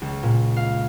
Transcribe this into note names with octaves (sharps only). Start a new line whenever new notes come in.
C#2
A#2
F5